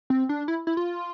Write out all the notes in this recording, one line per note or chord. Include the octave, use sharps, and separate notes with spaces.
C4
D4
E4
E4
F4